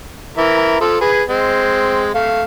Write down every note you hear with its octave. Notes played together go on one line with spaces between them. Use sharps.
E3 A#4 E5
F3 A4
G#4 B4
G#3 C4
A3 F5